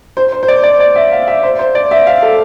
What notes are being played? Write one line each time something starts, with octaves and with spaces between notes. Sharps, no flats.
C5
C5
C5
D5
D5
D5
E5
F5
E5
C5
C5
D5
E5
F5
A4